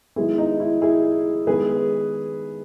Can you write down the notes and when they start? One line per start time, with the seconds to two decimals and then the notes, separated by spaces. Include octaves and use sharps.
0.16 D#3 G#3 B3 E4 G#4
0.38 D#4
0.60 E4
0.82 E4 G#4
1.47 D#3 G#3 B3 G#4 B4